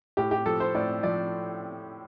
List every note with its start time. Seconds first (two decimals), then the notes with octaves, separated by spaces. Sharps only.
0.17 A2 G4
0.31 G4
0.46 F3 A4
0.60 C5
0.75 A2 D5
1.03 F3 D5